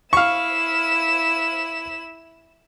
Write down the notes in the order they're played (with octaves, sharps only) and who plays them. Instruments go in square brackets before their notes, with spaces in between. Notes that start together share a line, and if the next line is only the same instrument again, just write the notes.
[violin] E4 E7 [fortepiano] F5 C#6